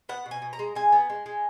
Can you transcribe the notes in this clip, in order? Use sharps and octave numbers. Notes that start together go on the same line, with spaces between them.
B3 F#5
B2
G#5
B2
A#5
G#3
G#3 G#5
B3
G#3
G#3